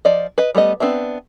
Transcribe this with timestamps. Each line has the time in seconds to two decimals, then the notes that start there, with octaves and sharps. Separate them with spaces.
0.05 F3 D5 D#5
0.38 B4 D#5
0.55 G3 A3 B3 D#5
0.80 B3 C4 D4 E5